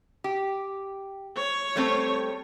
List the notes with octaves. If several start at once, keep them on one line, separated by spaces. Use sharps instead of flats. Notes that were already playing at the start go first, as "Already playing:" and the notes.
G4
C#5
G3 A3 C4